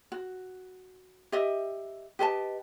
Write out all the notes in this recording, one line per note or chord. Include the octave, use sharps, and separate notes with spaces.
F#4
G4 D#5 E5
G4 B4 D#5 A5